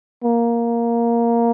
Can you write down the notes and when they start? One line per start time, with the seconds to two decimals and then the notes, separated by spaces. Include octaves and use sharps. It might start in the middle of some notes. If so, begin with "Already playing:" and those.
0.24 A#3